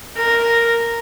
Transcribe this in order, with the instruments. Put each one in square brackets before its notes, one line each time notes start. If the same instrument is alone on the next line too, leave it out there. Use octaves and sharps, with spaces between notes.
[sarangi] A#4